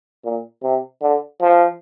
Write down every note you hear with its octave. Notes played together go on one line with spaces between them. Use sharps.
A#2
C3
D3
F3